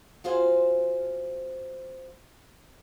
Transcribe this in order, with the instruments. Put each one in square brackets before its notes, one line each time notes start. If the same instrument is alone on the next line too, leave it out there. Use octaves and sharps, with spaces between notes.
[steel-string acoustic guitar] C4 F4 F#4 C5 F5 G#5